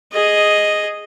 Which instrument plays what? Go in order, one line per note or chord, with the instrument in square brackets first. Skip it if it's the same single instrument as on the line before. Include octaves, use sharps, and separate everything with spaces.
[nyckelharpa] G#4 D#5